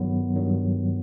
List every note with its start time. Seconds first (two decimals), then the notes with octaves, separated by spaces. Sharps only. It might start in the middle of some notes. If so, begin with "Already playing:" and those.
Already playing: G2 D#3 F#3 B3
0.36 G2 D#3 F#3